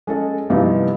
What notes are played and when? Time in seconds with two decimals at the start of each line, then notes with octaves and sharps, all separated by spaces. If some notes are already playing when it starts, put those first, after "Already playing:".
0.07 G#3 C#4 A4 D#5
0.50 G2 C3 E3 F3 B3 D#4